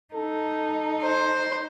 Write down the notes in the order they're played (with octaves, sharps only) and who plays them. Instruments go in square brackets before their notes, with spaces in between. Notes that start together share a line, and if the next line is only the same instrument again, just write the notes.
[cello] D#4 [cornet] A4
[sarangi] C5